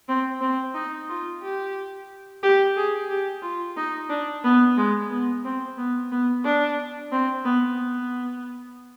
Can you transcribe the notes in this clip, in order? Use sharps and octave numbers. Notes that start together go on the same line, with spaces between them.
C4
C4
D#4
F4
G4
G4
G#4
G4
F4
D#4
D4
B3
G#3
B3
C4
B3
B3
D4
C4
B3
B3